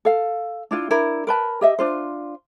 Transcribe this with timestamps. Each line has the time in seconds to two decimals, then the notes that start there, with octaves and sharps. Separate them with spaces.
0.05 A4 F5
0.71 D4 E4 F4
0.90 D4 E4 A#4
1.27 A#4 B4 A5
1.61 G4 D#5 E5
1.79 D4 F4 C5